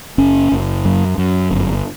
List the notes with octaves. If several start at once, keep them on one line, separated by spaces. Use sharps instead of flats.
F#1 C#4
F#1
F#2
F#2
G1